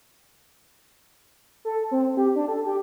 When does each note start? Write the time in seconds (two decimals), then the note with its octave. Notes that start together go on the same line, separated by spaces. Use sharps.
1.65 A4
1.91 C4
2.17 G4
2.36 D4
2.48 A4
2.66 G4